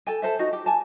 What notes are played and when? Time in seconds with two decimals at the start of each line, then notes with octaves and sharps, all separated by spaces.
0.07 A4 G5 G#5
0.22 A4 C5 E5
0.39 D#4 F#4
0.53 G4
0.66 G#5 A5